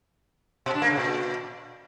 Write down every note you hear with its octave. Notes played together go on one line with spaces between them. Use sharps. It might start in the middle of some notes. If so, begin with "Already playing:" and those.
B2
D4
A#3
C#3
A#2